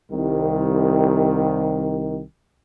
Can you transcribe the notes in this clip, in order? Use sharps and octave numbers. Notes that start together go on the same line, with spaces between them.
C2 D#3